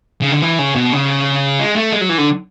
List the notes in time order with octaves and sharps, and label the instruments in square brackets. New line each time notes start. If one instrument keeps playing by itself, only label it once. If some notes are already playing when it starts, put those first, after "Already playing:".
[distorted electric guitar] C#3
D3
E3
C#3
B2
C#3
G#3
A3
G#3
F#3
E3
D3